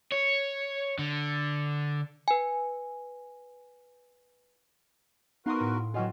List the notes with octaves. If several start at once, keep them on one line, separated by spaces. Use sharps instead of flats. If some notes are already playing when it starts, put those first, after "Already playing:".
C#5
D3
B4 G#5
B3 D#4 F#4 A#4 B4 F5 C6 D#6
A2
E3 F#3 C4 C#4 F4 F#4 D#5 F#5